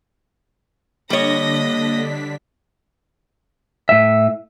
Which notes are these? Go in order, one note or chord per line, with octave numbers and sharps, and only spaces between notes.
D3 G3 A#3 D4 C#5 D#5 A#6 B6
A2 E5